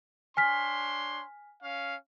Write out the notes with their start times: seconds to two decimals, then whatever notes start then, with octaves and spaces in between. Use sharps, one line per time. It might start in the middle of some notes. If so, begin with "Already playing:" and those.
0.37 D4 C#5 G#5 C6 F6 B6
1.62 C#4 F5